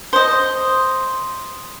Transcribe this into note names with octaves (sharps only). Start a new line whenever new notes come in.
C5 D#5